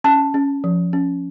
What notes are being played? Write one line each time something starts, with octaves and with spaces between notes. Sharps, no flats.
C#4 A5
C#4
F3
C#4